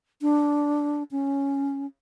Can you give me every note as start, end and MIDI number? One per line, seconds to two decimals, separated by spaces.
0.22 1.03 62
1.11 1.86 61